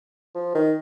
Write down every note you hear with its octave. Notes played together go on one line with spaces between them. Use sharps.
F3
D#3